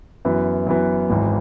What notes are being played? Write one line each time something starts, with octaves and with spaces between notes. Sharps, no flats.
F#2 E3 B3
F#2 E3 B3
G#1 G#2 E3